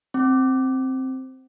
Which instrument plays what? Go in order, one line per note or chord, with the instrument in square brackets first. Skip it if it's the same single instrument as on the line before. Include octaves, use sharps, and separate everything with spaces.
[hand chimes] C4